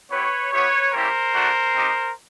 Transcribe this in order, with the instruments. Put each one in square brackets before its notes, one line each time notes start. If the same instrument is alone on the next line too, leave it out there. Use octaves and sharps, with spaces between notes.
[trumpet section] B3 E4 G4 B4 C#5
B3 E4 G4 B4 C#5
G3 A#3 C#4 E4 G4 A#4 C5
A3 D4 F#4
C4 D#4 G4